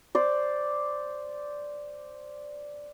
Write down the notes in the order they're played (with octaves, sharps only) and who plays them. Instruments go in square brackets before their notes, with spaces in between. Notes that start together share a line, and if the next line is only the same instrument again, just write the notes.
[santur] C5 D5